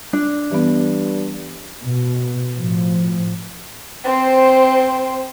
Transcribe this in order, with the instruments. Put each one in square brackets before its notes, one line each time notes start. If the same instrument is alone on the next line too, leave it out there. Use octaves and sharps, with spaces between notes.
[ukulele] D4
[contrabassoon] G2 [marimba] E3 B3
[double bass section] B2
A2 F3
[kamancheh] C4 C5